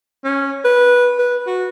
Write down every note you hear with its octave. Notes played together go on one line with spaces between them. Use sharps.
C#4
B4
B4
F#4